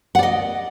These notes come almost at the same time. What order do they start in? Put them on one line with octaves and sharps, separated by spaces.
F#5 D5 D#5